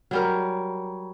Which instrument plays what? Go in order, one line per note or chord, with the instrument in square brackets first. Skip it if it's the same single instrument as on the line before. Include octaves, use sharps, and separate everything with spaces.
[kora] F#3 G3 A#4